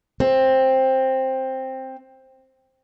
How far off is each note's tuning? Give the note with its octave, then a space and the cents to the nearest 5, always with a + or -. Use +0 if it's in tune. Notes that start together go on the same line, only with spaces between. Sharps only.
C4 +10